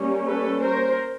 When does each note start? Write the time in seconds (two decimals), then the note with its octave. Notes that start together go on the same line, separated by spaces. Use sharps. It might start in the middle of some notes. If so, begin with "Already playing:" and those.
Already playing: G3 A#3 C#4
0.26 A4 B4
0.61 A#4 C5